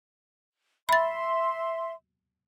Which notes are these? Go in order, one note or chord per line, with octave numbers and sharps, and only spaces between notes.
E5 B5 C6 A6